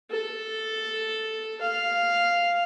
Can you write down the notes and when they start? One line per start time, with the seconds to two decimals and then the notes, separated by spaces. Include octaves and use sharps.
0.11 A4
1.61 F5